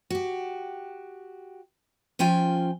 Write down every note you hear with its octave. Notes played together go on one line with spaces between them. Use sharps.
F#4 G4
F3 C#4 F4 G5 G#5